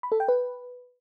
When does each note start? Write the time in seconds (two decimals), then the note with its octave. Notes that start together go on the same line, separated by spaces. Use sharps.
0.03 B5
0.12 A4
0.20 G5
0.28 B4